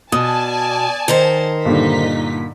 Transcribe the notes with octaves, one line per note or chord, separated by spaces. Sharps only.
B2 D5 G#5 A5 D#6
D#3 A#4 C5
G2 A#2 D3 D#4 B6